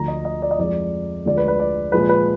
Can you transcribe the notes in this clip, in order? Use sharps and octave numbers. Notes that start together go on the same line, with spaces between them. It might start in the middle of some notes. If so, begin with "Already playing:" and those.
Already playing: D2 D3 F3 A#5
D#5
D#5
D5
D#5
F2 F3 G#3 D5
D2 D3 F3 G#3 D5
B4
B4
D5
A#2 F3 G#3 B4
B4